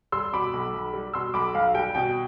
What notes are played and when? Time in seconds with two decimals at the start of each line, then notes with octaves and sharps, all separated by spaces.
0.12 G3 C6 E6
0.33 B2 B5 D6
0.54 B1
0.73 B1
0.94 G3
1.14 B2 C6 E6
1.34 B1 B5 D6
1.55 B1 F5
1.75 G3 G5
1.95 B2 G5